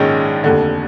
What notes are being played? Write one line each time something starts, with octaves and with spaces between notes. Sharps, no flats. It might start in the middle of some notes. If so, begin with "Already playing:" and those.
Already playing: A#1 G#2 D#3 G#3 C#4
F1 D#2 D3